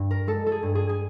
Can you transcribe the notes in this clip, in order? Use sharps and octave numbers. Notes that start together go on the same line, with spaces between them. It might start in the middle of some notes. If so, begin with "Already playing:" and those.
Already playing: G2
A#4
G#3 A4
A4
G#4
G2
G#4
G#4